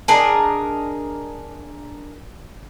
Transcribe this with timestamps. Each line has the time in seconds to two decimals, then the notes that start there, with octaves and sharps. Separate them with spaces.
0.08 D4 G#4 A#4 D#5